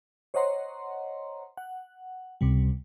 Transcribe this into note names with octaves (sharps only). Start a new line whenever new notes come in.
C5 C#5 D#5 F#5 A#5 C6
F#5
C#2 C3 G3